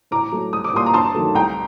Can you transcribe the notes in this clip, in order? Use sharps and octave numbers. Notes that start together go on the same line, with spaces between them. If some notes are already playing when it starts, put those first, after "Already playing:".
A2 A#5 D6
F#3 A3
C2 D#6
D6
A#2 G3 A#3 C6 D#6
A#5
G2 A5 C6
D#3 F#3 A3
C2 G5 A#5